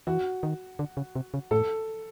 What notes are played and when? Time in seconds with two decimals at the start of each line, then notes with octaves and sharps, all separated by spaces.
0.07 E3 F#4
0.43 D#3
0.79 D3
0.97 C#3
1.15 C3
1.34 C#3
1.51 A2 A4